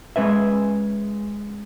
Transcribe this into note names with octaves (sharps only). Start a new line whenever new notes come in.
G#3 C#4 B4 E5